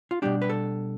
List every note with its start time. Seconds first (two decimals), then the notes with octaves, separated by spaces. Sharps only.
0.11 F4
0.22 B2 G3 D4 G4
0.42 B4
0.50 A4